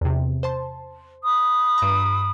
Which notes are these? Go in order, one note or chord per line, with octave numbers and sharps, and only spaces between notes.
E2 C3
C5 A5 C6
B5 D#6
G2 A#5